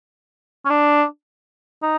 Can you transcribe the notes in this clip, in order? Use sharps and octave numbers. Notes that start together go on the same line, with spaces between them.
C#4
D4
D#4